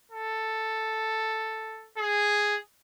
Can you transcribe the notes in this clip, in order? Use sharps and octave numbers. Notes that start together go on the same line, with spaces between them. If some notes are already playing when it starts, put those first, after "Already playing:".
A4
G#4